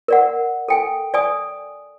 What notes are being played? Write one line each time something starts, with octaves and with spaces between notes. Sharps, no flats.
A#4 D5 F#5
A4 G5 G#5
D5 G#5 D#6